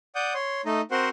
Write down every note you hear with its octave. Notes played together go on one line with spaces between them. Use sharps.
D5 F#5 D#6 G6
C#5 C6
A3 D#4 D#5
C4 F#4 A#4 C5 F#5 C6